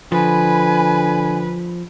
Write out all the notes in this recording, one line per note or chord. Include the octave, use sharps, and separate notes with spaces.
D3 F3 B4 G#5 B5